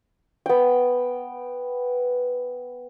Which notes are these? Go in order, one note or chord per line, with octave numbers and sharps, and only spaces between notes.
B3 G5